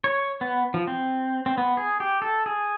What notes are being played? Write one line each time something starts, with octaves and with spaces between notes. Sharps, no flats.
C#5
B3
F3
C4
C4
B3
G#4
G4
A4
G#4